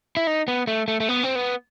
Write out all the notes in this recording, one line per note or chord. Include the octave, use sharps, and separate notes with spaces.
E4
D#4
B3
A3
A3
A3
B3
C4
B3